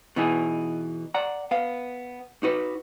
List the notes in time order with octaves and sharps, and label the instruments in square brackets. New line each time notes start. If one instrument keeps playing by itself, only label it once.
[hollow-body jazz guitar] B2 E3 D#4 G#4
D5 F#5 A#5
B3 F5
D#4 F#4 B4